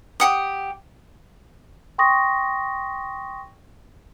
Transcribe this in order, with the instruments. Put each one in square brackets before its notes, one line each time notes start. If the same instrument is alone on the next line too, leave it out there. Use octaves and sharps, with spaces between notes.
[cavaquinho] G4 F#5 D#6
[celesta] G5 C6 C#6 D#6 A#6